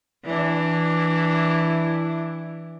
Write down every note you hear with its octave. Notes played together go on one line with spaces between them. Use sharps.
E3 D4 E4